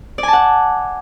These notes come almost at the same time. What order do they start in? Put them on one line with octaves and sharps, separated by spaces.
D5 G#5 A5 F#5